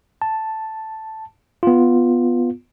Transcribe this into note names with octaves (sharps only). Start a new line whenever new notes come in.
A5
B3 F4